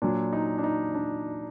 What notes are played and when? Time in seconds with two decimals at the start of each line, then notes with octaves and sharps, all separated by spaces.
0.02 A#2 F#3 D4
0.33 D#4
0.58 D4
0.64 D#4
0.94 D4